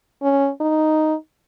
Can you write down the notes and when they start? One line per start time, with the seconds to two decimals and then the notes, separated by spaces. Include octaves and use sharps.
0.22 C#4
0.61 D#4